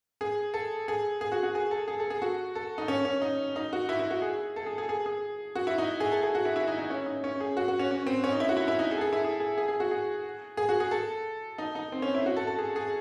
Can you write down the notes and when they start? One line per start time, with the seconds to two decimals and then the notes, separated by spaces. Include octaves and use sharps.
0.21 G#4
0.54 A4
0.88 G#4
1.21 G#4
1.32 F#4
1.43 F#4
1.55 G#4
1.71 A4
1.88 G#4
2.00 A4
2.10 G#4
2.22 F#4
2.55 A4
2.78 D#4
2.88 C#4
3.05 C#4
3.22 D#4
3.56 D#4
3.73 F#4
3.89 E4
3.99 E4
4.11 F#4
4.22 G#4
4.56 A4
4.66 G#4
4.78 G#4
4.89 G#4
5.06 G#4
5.55 F#4
5.67 E4
5.78 D#4
6.00 G#4
6.12 A4
6.23 G#4
6.35 F#4
6.45 E4
6.56 E4
6.68 D#4
6.79 D#4
6.90 C#4
7.06 D#4
7.24 C#4
7.40 G#4
7.57 F#4
7.68 F#4
7.79 C#4
7.91 C#4
8.07 C4
8.24 C#4
8.32 D#4
8.40 E4
8.49 F#4
8.57 E4
8.68 E4
8.79 D#4
8.91 G#4
8.98 A4
9.01 G#4
9.13 E4
9.25 G#4
9.40 G#4
9.58 G#4
9.68 G#4
9.80 F#4
9.91 G#4
10.57 G#4
10.69 F#4
10.80 G#4
10.91 A4
11.58 D#4
11.75 D#4
11.92 C4
12.02 C#4
12.15 E4
12.26 F#4
12.36 A4
12.47 A4
12.59 G#4
12.76 G#4